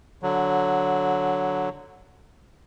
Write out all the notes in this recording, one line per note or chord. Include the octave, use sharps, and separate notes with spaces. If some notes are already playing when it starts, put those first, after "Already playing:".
D3 F#3